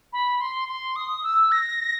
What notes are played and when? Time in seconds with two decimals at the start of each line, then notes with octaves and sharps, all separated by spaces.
0.13 B5
0.41 C6
0.69 C6
0.96 D#6
1.24 E6
1.52 A#6